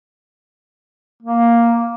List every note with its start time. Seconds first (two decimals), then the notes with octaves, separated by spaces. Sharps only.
1.22 A#3